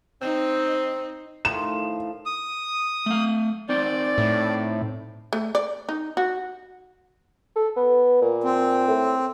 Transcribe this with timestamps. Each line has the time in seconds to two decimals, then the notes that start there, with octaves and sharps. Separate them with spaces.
0.22 C4 D#4
1.45 A2 D#3 F3 E7
2.26 D#6
3.06 A3 F5
3.69 C4 D#4 C5 D5
4.18 A2
5.33 A3
5.55 D5
5.89 D#4
6.17 F#4
7.56 A4
7.76 B3
8.21 A#2
8.44 C4
8.87 A2